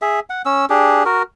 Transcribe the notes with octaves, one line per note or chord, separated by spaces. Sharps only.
G#4 E5
F#5
C#4 E6
D4 G4 G#4
F#4 A#4